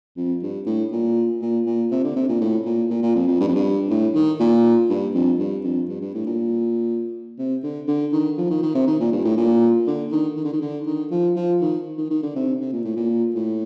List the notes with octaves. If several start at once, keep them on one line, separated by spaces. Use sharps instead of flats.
F2
G2
A2
A#2
A#2
A#2
C3
D3
C3
A#2
A2
A#2
A#2
A#2
F2
F2
G2
F2
G2
A2
D#3
A#2
G2
F2
G2
F2
G2
G2
A2
A#2
C3
D3
D3
D#3
F3
D#3
D#3
C3
D#3
A#2
G2
A2
A#2
D3
D#3
D#3
D3
D#3
D3
D#3
F3
F3
D#3
D#3
D#3
D3
C3
C3
A#2
A2
A#2
A2